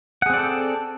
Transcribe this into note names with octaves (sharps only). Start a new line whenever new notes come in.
C4 G#4 A4 D5 F#5